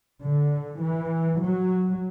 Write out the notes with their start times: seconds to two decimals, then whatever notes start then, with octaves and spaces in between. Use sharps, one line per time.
0.22 D3
0.82 E3
1.42 F#3